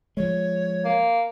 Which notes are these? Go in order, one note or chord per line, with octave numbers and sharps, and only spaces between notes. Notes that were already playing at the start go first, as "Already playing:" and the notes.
F3 G#3 C#5
A#3